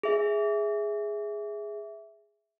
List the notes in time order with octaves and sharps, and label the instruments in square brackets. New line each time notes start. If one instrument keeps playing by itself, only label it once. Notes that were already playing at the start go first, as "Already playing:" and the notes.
[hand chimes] G#4 E5